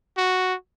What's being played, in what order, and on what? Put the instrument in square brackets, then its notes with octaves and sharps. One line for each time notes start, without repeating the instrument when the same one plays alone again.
[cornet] F#4